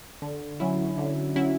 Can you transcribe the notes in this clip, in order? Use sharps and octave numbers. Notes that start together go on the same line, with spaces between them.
D3
F#3 C#4 E4
D3
F#3 C#4 E4